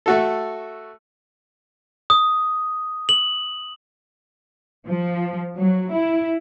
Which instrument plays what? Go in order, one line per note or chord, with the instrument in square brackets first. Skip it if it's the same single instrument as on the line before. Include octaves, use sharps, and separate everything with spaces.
[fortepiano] A3 F#4 A4
[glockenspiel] D#6
F#7
[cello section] F3
F#3
E4